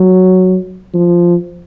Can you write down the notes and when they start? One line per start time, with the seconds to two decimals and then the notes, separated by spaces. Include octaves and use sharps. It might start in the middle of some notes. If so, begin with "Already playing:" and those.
Already playing: F#3
0.94 F3